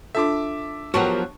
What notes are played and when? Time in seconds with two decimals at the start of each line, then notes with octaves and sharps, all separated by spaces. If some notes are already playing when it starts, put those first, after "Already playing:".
0.15 D4 F4 A4 E5 A5 D6
0.94 F3 F#3 B3 F#4 G4 A#4 A5 C#6